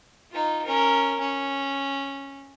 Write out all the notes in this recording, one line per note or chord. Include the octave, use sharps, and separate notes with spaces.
D#4 F4
C#4 A#4
C#4